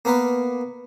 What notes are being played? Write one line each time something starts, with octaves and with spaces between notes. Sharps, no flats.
A#3 B3 A#4 B4